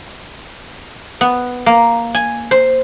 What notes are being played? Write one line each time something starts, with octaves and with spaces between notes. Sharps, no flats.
B3
A#3
G#5
C5